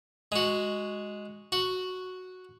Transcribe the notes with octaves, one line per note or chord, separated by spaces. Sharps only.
G#3 F#4
F#4